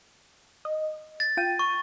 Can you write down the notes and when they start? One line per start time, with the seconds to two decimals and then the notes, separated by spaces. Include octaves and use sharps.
0.65 D#5
1.20 A6
1.37 F4 G5 D#7
1.59 C#6